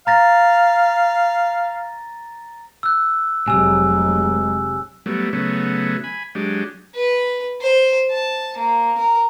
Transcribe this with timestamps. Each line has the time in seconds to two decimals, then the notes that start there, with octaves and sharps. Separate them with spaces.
0.07 F5 A#5 A6 A#6
2.83 E6 F#6
3.48 F1 C3 F#3 G#3 G#5 E6
5.06 F#3 G3 A3 B3
5.33 C#3 F#3 A3 B3
6.04 G#5 B5
6.35 F#3 G#3 D4 G4
6.95 B4
7.61 C5
8.11 A5
8.58 A#3
8.98 A#4